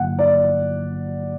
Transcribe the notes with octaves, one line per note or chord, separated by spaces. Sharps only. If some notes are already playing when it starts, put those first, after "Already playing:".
Already playing: G1 G2 D3 F#3 A#3 F#5
D5